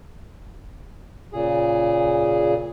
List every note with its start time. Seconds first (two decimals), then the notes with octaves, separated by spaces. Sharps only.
1.33 A#2 C#3 G#4